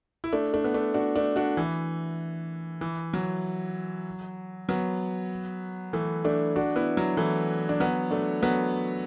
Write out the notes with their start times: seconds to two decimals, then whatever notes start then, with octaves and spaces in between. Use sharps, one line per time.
0.24 E4
0.33 A3 D4
0.53 A3 D4
0.64 B3
0.74 A3 D4
0.94 D4 F#4
1.16 A3 D4
1.36 D4 F#4
1.57 E3
2.81 E3
3.14 F#3
4.69 F#3 B3
5.93 E3 A3
6.25 A3 D4
6.56 D4 F#4
6.76 B3 E4
6.97 F#3
7.17 E3 A3
7.69 D4
7.80 F#3 B3
8.11 A3 D4
8.43 F#3 B3